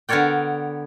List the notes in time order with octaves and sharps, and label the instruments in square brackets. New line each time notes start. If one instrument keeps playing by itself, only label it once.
[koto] D3 B3 A#4 C#5 D5 G5